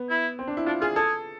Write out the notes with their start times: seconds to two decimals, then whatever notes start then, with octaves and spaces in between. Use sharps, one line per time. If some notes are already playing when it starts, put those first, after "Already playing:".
Already playing: B3
0.10 E4
0.39 C4
0.47 D4
0.57 E4
0.66 D4 F4
0.81 F4 G#4
0.96 G#4 A4